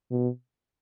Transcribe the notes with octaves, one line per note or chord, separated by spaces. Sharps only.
B2